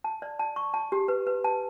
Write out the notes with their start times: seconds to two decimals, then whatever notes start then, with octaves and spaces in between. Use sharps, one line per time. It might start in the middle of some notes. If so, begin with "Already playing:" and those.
0.04 A5
0.22 D5
0.39 A5
0.56 C#6
0.74 A5
0.92 G4
1.08 B4
1.27 B4
1.44 A5